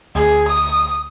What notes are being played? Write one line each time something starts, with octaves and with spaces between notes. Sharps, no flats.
D2 G#4
D#6